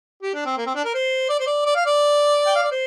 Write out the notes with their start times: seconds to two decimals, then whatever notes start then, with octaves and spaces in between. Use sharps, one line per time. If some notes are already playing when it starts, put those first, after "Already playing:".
0.22 G4
0.34 D4
0.45 C4
0.58 A#3
0.66 C4
0.75 D4
0.84 A#4
0.94 C5
1.29 D5
1.40 C5
1.46 D5
1.65 D5
1.75 F5
1.86 D5
2.46 G5
2.56 F5
2.63 D5
2.71 C5